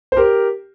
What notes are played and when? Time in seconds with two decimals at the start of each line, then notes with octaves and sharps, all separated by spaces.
0.12 C5
0.16 G4 A#4